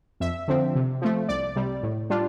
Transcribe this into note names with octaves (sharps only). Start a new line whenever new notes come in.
F2 E5
D3 F3 C4
C3
F3 A3
C2 D5
C3 G3
A2
G3 D4 F4